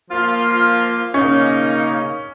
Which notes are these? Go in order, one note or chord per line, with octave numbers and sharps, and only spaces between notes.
F3 A#3 F4
C#3 A#3 C#4 D#4